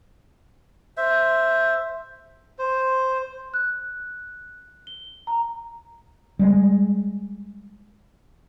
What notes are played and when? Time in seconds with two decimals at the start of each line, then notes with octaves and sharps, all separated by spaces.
0.97 C5 E5
2.59 C5
3.54 F#6
4.87 G7
5.27 A#5
6.39 G3 G#3